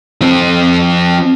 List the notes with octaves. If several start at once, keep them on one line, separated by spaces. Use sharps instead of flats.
F3 C4